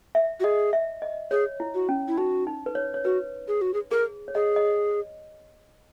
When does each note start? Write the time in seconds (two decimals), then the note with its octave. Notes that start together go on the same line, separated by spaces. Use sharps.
0.15 E5
0.40 F#4
0.44 G#4 D#5
0.73 E5
1.02 D#5
1.31 G#4 C#5
1.60 E4
1.75 F#4
1.89 C#4
2.08 E4
2.18 D#4 F#4
2.47 D#4
2.66 B4
2.75 C#5
2.94 C#5
3.05 F#4 B4
3.48 G#4
3.61 F#4
3.74 G#4
3.91 G#4 A#4
4.28 C#5
4.35 G#4 D#5
4.56 D#5